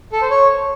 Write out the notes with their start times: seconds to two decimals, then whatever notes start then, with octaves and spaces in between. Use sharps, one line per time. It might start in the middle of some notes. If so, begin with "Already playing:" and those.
0.12 A4
0.21 C5
0.30 C#5